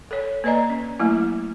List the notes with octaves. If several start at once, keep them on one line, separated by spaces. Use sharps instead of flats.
A4 C#5
A#3 B4 D5 D#5 A#5
C#4
F#3 A3 A#3 E4